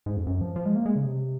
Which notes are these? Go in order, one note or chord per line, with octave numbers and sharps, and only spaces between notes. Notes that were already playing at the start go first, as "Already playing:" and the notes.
G#2
F2
F#2
F3
F3
G#3
A#3
G#3
C#3
C3